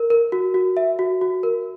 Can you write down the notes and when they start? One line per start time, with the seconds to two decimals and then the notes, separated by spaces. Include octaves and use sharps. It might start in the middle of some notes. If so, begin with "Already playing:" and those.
Already playing: A#4
0.10 A#4
0.32 F#4
0.54 F#4
0.77 E5
0.99 F#4
1.21 F#4
1.43 A#4